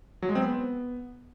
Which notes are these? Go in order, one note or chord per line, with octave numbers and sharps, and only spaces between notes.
F#3
G#3
C4
B3